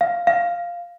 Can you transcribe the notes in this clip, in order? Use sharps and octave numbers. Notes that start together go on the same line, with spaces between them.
F5
F5